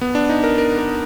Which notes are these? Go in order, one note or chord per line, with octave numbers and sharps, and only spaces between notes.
B3
D4
D#4
A#4
A#4
A#4